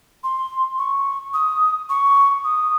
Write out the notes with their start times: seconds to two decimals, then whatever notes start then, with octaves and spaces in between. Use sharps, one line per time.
0.24 C6
0.78 C#6
1.34 D#6
1.89 C#6
2.44 D#6